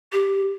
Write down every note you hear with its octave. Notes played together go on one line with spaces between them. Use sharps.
G4